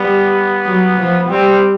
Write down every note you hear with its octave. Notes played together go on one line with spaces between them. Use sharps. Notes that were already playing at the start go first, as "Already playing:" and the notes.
Already playing: G3 B3
F#3
F3
G3 C4